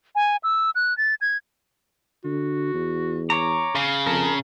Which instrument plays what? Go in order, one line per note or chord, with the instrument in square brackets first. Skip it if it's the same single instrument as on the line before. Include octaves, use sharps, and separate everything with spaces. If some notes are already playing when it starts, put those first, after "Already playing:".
[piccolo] G#5
E6
F#6
A6
G#6
[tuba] D3 [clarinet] F#4
[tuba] E2
[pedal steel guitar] C#5 A#5 [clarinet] D6
[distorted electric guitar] C#3
[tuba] F2 [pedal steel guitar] A#4 [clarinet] A5